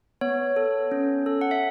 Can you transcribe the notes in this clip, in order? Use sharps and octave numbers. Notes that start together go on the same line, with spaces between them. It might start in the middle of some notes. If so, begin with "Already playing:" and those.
B3 C#5
A4
C#4
A4
F#5
E5